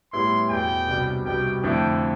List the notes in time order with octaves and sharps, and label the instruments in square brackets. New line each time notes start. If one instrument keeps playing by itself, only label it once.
[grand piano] A2 G3 B3 E4 [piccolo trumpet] C6
[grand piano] E2 B2 B3 [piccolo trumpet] G5
[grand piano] C2 B2 G3 D4
[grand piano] C2 B2 G3 B3 [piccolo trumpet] G5
[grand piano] F2 D3 A3 E4 [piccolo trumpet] G5